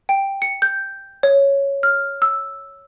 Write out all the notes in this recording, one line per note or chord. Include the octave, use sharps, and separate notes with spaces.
G5
C#7
G6
C#5
F6
E6